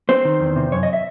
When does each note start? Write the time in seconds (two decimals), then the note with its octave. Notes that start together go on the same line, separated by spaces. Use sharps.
0.09 C4 C5
0.25 D#3
0.40 E2
0.56 C3
0.72 F#2 C#5
0.83 D#5
0.93 E5